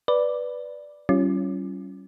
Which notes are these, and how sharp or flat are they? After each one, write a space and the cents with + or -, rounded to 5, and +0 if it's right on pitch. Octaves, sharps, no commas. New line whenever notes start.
B4 +0 D5 +0
G3 -35 C#4 +0 F4 -30